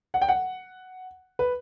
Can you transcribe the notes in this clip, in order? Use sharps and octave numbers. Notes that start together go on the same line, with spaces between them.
F#5
G5
F#5
B4